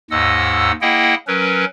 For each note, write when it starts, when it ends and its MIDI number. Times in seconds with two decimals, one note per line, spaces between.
0.11 0.72 39
0.11 0.72 44
0.11 0.72 75
0.11 0.72 78
0.11 0.72 88
0.81 1.15 58
0.81 1.15 64
0.81 1.15 68
0.81 1.15 75
0.81 1.15 78
0.81 1.15 79
1.27 1.65 54
1.27 1.65 61
1.27 1.65 70
1.27 1.65 71